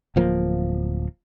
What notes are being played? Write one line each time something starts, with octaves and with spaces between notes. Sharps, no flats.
D1 F3 A#3